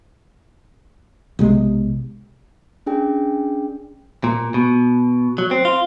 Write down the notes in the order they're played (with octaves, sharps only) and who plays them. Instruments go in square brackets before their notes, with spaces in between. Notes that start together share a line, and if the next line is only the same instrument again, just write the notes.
[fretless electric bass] B1 C3 G#3
[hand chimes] C#4 D4 G#4 G5
[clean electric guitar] A#2
B2
F#3
C4
F4